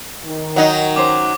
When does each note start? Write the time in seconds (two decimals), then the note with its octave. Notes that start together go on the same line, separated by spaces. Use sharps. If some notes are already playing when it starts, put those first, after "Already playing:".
0.24 D#3
0.56 F#3 D#4 D#5 F#5
0.96 C#4 C5 D6